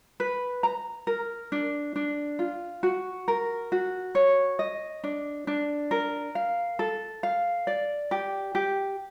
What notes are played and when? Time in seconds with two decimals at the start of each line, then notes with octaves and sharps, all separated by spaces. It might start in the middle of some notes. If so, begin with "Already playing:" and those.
0.20 B4
0.63 A#5
1.07 A#4
1.52 D4
1.96 D4
2.39 F4
2.83 F#4
3.28 A#4
3.72 F#4
4.15 C#5
4.59 D#5
5.04 D4
5.47 D4
5.91 A#4
6.35 F5
6.79 A4
7.23 F5
7.67 D5
8.11 G4
8.55 G4